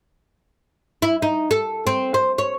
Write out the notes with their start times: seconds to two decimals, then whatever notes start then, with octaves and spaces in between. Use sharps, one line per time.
1.02 E4
1.22 D#4
1.51 A4
1.87 C4
2.14 C5
2.38 C#5